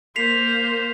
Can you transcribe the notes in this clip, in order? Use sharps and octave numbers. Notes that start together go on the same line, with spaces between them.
A#3 C5 B6 C7 F7